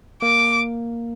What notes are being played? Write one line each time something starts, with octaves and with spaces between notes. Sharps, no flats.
A#3 D6